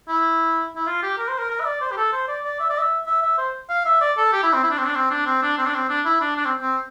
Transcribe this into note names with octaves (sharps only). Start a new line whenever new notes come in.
E4
E4
F4
G4
A#4
C5
A#4
A#4
E5
D5
C5
G4
A4
C5
D5
D5
E5
D5
E5
E5
E5
C5
F5
E5
D5
A4
G4
E4
C4
E4
D4
C4
D4
C4
D4
C4
D4
C4
D4
C4
D4
E4
D4
D4
C4
C4